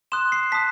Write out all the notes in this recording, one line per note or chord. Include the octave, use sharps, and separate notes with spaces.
C6 D#6 F#6 E7
C7
A5 D#6 F#6 B6